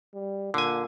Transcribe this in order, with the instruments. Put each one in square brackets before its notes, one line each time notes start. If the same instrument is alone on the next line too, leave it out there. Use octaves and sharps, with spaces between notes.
[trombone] G3
[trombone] A#2 [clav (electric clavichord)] D3 G#5